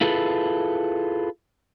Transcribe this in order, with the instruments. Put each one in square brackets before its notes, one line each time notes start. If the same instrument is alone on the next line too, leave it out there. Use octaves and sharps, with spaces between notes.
[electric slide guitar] E4 F4 G#4 A4 B4